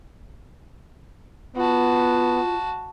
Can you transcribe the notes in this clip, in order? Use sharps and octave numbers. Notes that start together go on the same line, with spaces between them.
B3 F4 F#4 A5